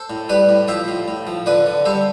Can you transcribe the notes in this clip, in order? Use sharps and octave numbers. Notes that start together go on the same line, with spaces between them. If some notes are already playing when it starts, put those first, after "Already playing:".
Already playing: A4 C5
A2
G3 B4 D5
A2
F3 C5 E5
A2
A2
F3
D3 B4 D5
D3
G3 A4 C5